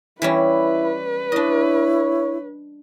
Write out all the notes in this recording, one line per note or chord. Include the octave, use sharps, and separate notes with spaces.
E3 G3 C#4 E4 B4
D4 E4 C#5 D#5